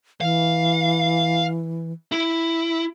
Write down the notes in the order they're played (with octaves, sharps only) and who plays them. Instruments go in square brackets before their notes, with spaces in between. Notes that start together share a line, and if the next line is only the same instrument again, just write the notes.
[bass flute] E3 [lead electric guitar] F5
[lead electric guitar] E4